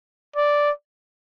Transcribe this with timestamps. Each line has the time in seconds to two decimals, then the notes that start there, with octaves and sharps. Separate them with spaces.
0.36 D5